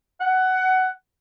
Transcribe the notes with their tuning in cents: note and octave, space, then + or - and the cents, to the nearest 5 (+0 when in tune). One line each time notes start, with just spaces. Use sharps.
F#5 +15